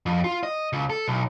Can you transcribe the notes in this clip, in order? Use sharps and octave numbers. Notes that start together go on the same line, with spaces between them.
F2
F4
D#5
C#2
A4
B1